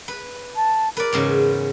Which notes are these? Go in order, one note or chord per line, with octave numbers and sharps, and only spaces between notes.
B4
A5
A#4 B4 D5
E2 G#2 C#3